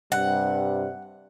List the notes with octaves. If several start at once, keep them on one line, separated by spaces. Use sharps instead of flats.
G2 C3 G3 F#5